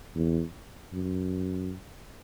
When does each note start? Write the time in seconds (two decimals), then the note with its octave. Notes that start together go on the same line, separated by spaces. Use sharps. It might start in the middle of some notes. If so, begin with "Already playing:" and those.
0.15 E2
0.93 F#2